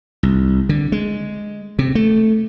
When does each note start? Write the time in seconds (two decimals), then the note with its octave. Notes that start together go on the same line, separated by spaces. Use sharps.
0.23 C2
0.69 D3
0.92 G#3
1.79 C3
1.95 A3